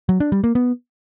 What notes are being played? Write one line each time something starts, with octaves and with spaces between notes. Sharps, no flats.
F#3
D4
G3
A#3
B3